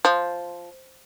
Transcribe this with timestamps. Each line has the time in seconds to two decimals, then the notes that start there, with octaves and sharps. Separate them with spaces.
0.05 F3